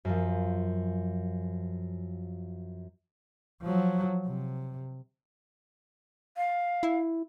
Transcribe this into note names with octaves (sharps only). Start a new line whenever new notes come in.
F#2 F3
F3 F#3
C3
F5
E4